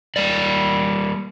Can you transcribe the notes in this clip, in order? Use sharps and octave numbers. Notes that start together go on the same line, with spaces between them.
G3 A#3 D5